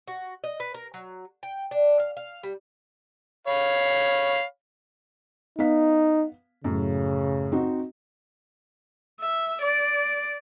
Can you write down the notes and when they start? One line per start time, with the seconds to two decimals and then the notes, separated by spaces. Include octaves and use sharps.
0.08 F#4
0.44 D#5
0.60 B4
0.74 A#4
0.94 F#3
1.43 G5
1.71 D4
2.00 F5
2.17 F5
2.43 G3
3.47 C#5 F5 B5
5.59 B3 D#4 F5 B6
6.64 F#2 A2 C#3
7.52 C4 D#4 F#4
9.20 E5
9.62 D5